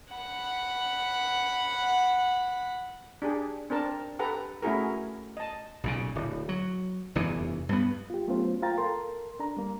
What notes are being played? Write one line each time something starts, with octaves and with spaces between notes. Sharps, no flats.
F#5 B5
D4 G4 G#4
C4 D4 A#4 A5
G4 A4 B4 F#5 A#5
A3 C#4 E4 F#4 G#4 A#4
D#5 A5
B1 A#2 C#3
D1
F#3
F1 E2 G2 E3
G2 B3
F4 G4
F#3 A3 B3 C#4 F4 C5
A#3 F4 F5 G5 A#5 A6
A4 A#4 C6
D4 A#5
G3 A#3